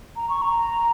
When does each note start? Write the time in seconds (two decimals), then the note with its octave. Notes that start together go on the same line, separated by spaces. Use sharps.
0.16 A#5
0.29 C#6
0.42 A#5